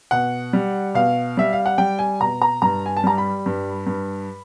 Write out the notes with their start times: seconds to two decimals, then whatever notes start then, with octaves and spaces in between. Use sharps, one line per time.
0.11 B2 F#5
0.53 G3
0.94 B2 F5
1.37 G3 E5
1.53 F5
1.66 F#5
1.78 G3 G5
1.99 G#5
2.20 B2 A#5
2.42 A#5
2.62 G2 A#5
2.86 G#5
2.97 A5
3.04 G3 A#5
3.18 B5
3.46 G2
3.87 G2